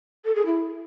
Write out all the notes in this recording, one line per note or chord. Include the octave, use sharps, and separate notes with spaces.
A4
G#4
E4